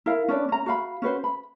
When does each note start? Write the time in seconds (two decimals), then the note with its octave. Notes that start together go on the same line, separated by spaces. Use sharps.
0.06 E4 A#4 F5
0.28 C#4 D4 B4 D5
0.49 C#4 A#5
0.66 F#4 F5 B5
1.02 C#4 F#4 B4 C5
1.24 B5